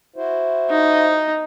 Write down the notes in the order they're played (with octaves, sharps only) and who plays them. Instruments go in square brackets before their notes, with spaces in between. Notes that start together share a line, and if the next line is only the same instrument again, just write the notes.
[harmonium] E4 F#4 C5
[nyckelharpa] D#4